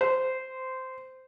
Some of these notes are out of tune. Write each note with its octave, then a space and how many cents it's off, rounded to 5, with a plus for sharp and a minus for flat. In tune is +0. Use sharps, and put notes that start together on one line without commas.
C5 -15